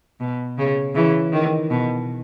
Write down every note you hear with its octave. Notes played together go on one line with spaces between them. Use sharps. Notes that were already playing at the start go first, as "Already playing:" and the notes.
B2
C#3
C#3 E3
D#3
B2